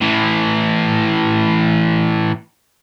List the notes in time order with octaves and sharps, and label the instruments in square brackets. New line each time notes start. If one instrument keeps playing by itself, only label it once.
[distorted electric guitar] A2 E3